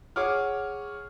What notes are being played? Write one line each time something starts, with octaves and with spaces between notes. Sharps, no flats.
G#4 C#5 F#5 D6 F6